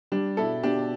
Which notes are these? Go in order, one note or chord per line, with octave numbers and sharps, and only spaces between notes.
G3 D4 G4
B2 E4 A4
B2 D4 G4